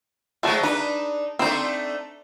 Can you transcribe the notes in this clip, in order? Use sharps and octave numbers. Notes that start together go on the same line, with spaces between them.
G#2 F#3 G#3 A3 F#4 A5
D4 D#4 B4
A3 C4 D4 D#4 C5